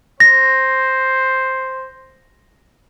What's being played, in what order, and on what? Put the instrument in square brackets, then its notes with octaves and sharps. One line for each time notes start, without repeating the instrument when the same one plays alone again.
[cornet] C5 [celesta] A#6